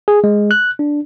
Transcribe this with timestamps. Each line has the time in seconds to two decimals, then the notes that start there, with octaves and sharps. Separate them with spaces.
0.08 G#4
0.24 G#3
0.51 F#6
0.79 D4